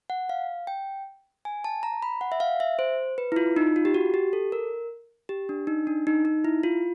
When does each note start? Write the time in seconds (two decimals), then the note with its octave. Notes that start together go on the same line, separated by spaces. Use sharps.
0.10 F#5
0.29 F5
0.67 G5
1.45 G#5
1.64 A5
1.83 A#5
2.02 B5
2.21 F#5
2.32 E5
2.40 F5
2.60 E5
2.79 C5
3.18 B4
3.32 E4
3.36 F4
3.56 D#4
3.76 F4
3.85 G4
3.94 F#4
4.14 G4
4.33 A4
4.52 A#4
5.29 G4
5.49 D4
5.67 D#4
5.87 D4
6.07 D#4
6.25 D#4
6.45 E4
6.63 F4